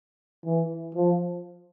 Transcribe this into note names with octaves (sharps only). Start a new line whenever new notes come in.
E3
F3